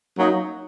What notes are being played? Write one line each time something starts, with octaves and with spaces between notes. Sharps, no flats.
F#3 A#3 D#4